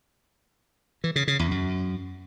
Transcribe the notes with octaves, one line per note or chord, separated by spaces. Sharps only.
E3
C#3
C#3
E2
F#2